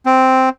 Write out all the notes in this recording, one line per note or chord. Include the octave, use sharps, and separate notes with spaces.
C4